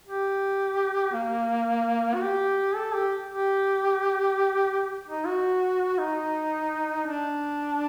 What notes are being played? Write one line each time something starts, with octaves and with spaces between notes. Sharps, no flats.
G4
A#3
F#4
G4
A4
G4
G4
D#4
F#4
D#4
D4